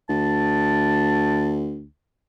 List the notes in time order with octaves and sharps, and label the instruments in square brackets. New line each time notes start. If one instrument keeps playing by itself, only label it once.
[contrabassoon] D2 [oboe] A5